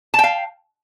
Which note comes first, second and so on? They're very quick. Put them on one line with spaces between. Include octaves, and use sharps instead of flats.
A5 G5 F5